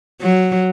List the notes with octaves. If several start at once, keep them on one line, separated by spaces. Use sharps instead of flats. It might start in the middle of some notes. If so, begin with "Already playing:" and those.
F#3